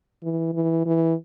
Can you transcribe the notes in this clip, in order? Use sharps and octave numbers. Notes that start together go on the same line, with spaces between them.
E3
E3
E3